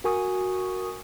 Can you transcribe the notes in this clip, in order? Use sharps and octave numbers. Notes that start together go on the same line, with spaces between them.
F#4 A#4 G#5 C#6 D#6